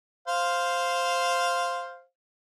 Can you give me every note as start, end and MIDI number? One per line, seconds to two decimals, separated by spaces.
0.28 2.02 72
0.28 2.02 77